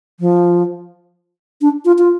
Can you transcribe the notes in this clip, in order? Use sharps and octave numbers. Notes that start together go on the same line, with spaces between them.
F3
D4
F4
F4